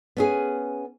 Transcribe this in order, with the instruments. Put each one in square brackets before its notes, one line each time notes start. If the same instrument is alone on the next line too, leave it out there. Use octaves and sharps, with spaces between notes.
[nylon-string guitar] B3 C#4 G#4